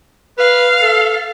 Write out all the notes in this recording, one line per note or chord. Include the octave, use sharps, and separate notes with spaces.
B4 F5
A4